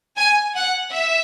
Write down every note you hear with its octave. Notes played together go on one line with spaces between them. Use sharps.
G#5
F#5
E5